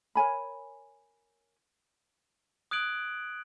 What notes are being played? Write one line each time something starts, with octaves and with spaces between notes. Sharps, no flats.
A#4 C#5 G#5 B5
D#6 F#6 G#6 D7 F#7